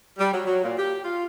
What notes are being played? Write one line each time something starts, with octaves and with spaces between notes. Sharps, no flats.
G3
F#3
F#3
A#2
G4
F4